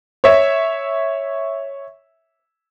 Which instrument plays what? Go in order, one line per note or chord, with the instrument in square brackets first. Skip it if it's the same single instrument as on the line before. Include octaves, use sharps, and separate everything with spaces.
[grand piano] C#5 E5